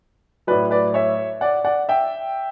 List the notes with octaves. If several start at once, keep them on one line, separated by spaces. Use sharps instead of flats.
A2 F#3 B4 D5
B4 D5
C#5 E5
D5 F#5
D5 F#5
E5 G5